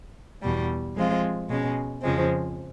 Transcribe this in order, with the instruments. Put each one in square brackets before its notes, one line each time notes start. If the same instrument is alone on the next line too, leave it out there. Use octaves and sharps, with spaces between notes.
[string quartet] E2 B2 G3
F3 G#3 C4 F4
B2 G#3 C#4
F2 C#3 F3 G#3 C4